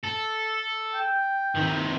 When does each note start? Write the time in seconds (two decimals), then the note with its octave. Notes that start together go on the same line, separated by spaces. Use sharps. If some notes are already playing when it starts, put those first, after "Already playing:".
0.04 A4
0.94 G5
1.55 C3 D#3